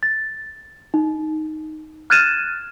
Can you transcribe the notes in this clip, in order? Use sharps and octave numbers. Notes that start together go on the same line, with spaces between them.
A6
D#4
F6 F#6 G#6 A6 D#7 E7